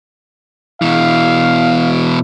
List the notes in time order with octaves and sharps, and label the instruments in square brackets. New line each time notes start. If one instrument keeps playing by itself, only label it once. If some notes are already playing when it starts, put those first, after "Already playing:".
[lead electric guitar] B2 E3 [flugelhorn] F5